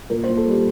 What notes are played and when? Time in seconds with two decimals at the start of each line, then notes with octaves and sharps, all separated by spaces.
0.10 A#2 A#4
0.24 C5
0.28 A#2
0.37 A4
0.47 G3 G4